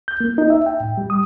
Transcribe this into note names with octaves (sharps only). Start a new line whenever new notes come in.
G6
A#3
D#4
E5
G5
A2
G3
D#6